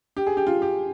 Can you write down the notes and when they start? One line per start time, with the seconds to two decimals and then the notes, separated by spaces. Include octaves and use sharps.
0.17 G4
0.27 G#4
0.37 G4
0.47 F4
0.62 G4